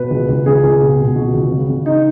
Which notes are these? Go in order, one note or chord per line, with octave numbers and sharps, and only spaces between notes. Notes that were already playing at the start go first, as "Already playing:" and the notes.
Already playing: B2 B4
C#2
C#2
C#2 G#4
C#2
B2
B2
C#2 F#4
C#2
C#3
C#3
D#4